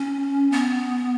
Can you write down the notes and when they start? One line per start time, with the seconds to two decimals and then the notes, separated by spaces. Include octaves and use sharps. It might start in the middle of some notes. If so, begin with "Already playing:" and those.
Already playing: C#4
0.52 B3